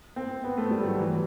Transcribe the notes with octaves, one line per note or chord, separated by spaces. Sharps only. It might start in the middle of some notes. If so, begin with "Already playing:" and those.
C4
B3
A3
G3
F#3
E3